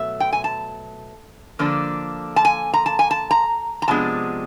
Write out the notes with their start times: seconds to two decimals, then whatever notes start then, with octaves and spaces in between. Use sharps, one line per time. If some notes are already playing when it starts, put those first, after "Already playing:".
Already playing: B2 F#3 A3 E5
0.20 G5
0.33 G#5
0.44 A5
1.59 D3 F3 A#3 D4
2.36 A5
2.45 G#5
2.74 A#5
2.86 A5
2.99 G#5
3.11 A5
3.31 A#5
3.82 A#5
3.88 C3 F3 G#3 B3 D4 A5